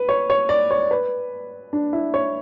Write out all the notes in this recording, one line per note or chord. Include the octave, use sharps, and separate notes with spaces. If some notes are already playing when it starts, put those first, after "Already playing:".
Already playing: B4
C#5
C#5
D5
C#5
B4
D4
E4
C#5